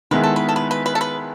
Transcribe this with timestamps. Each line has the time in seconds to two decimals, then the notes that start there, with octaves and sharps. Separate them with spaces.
0.11 D#3 G#3 B3 E4 B4
0.24 A4
0.36 B4
0.49 A4
0.56 B4
0.71 B4
0.86 B4
0.95 A4
1.01 B4